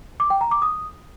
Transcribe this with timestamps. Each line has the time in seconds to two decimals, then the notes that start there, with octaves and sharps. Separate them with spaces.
0.20 D6
0.30 G5
0.41 A#5
0.51 D6
0.62 D#6